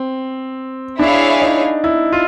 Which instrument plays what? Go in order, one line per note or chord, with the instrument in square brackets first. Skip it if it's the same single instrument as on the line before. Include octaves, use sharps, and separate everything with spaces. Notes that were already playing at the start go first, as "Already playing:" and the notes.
Already playing: [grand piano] C4
[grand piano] D4 [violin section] E4 G#4 C#5 F5
[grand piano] D#4
E4
F4